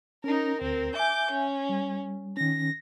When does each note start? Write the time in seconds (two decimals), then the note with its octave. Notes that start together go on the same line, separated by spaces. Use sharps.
0.24 C#4 D#4 A#4
0.61 D2 C4 A#4
0.95 E5 G#5 D6 G6
1.31 C#4
1.69 G3
2.37 D#3 C#4 A#6